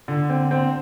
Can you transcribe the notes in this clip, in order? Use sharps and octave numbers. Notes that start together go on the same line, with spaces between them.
D3
C4
C4